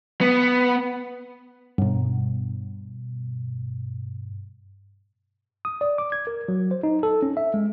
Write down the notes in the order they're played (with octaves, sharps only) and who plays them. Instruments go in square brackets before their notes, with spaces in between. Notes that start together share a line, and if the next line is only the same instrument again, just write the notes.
[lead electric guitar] B3
[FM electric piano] G2 B2
[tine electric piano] D#6
D5
D6
G#6
A#4
F#3
C5
D#4
A4
C#4
E5
G#3